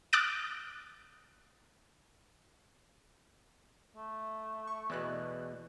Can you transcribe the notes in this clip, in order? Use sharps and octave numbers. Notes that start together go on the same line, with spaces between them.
D6 D#6 F6 F#6 A6 D7
A3
C#6
E2 B2 E3 D5 F#6